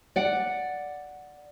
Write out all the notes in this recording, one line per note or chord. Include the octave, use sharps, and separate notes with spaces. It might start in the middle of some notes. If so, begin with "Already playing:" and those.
D5 F#5